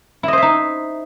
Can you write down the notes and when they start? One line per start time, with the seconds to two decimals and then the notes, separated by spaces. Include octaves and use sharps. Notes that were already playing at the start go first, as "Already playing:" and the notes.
0.23 E4
0.28 D#5
0.33 C5
0.38 E5
0.42 D#4